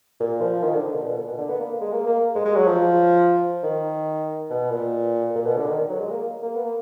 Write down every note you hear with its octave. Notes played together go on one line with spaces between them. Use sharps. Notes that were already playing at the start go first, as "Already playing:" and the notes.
A#2
F3
D#3
D3
D3
A#2
B2
A#2
B2
D3
B3
A#3
G#3
A#3
A#3
G#3
G#3
F#3
F3
D#3
B2
A#2
A#2
B2
D3
D#3
F#3
G#3
A#3
A#3
B3
A#3